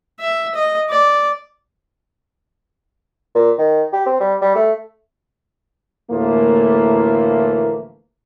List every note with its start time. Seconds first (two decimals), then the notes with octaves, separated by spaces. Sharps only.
0.20 E5
0.54 D#5
0.90 D5
3.35 A#2
3.58 D#3
3.93 G4
4.06 C4
4.20 G3
4.42 G3
4.55 A3
6.10 D2 A2 E3 F3 A3 A#3